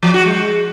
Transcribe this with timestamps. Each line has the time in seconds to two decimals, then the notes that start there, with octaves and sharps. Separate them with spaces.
0.03 F3
0.14 F#4
0.25 G#3